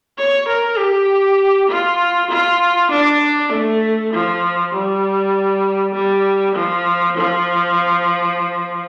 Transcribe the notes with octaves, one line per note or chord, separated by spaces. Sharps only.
C#5
A#4
G4
F4
F4
D4
A3
F3
G3
G3
F3
F3